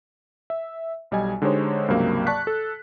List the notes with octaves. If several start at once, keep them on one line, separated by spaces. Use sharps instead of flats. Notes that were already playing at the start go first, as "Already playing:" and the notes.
E5
B1 G3 D#5 G#5
D3 G#3 D#4 G4 C5 C#5
C#2 G2 C3 F#3 A#3
D5 A5 C#6 F#6 B6
A4